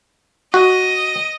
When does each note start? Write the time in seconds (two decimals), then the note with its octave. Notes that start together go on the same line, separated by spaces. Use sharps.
0.54 F#4 D#5